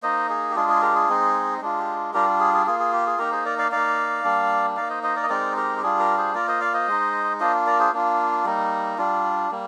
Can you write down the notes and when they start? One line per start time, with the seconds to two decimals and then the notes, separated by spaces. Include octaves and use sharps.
0.03 A#3 D#4 C5 D#5
0.29 G#4
0.51 G4
0.56 G#3 D4 F4 G#4
0.69 G#4
0.82 G4 A#4
0.95 G#4
1.09 G#3 C4 D#4
1.61 G#3 D4 F4
1.79 G4
2.14 G3 D4 F4 G4 A#4
2.40 G#4
2.53 G#4
2.66 A#3 F4 G#4
2.79 G#4
2.93 G4
3.06 G#4
3.19 A#3 D#4 G4 A#4
3.32 G#4 C5
3.45 A#4 D5
3.58 D5 F5
3.71 A#3 D#4 D5 F5
4.24 G3 A#3 D4
4.77 A#3 D#4 D5 F5
4.90 C5 D#5
5.03 C5 D#5
5.16 A#4 D5
5.23 D#5
5.30 G#3 C4 D#4 A#4 D5
5.56 G4 A#4
5.77 G4
5.82 G3 D4 F4 G#4
5.99 G4 A#4
6.17 G#4 C5
6.35 A#3 F4 A#4 D5
6.48 C5 D#5
6.61 D5 F5
6.74 C5 D#5
6.88 G#3 D#4
7.40 A#3 D4 F4 C5 D#5
7.66 A#4 D5
7.79 G#4 C5
7.93 A#3 D4 F4
8.45 G3 A#3 D#4
8.98 G3 D4 F4
9.51 G3 A#3